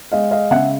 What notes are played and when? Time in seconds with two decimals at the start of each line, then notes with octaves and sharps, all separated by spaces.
0.12 G#3 D#5 F5
0.31 D#5 F5
0.51 C#3 E5 F#5